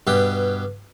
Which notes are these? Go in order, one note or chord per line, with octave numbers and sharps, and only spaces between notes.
G2 B2 G4